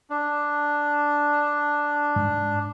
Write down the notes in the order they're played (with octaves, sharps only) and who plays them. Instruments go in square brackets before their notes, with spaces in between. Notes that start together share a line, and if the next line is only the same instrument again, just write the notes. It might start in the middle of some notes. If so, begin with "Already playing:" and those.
[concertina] D4
[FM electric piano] G#2